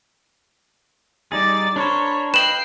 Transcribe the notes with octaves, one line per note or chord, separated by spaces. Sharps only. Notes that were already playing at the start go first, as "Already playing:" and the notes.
G3 D#4 G#4 D5 A6
D4 A#4 C5 C#5 B5
B4 D#5 F5 G5 C7 E7 F#7